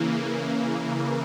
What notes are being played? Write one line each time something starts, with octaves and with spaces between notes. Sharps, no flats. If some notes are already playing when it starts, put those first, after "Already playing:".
Already playing: C#3 E3 A#3